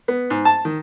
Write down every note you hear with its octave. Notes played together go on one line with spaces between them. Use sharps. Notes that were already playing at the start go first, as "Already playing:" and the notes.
B3
G#2
A5
D#3